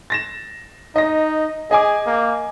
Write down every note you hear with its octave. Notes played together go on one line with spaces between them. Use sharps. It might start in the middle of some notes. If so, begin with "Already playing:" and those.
A6 A#6 E7
D#4 D#5 A#6
G#4 D#5 G#5 D6
A#3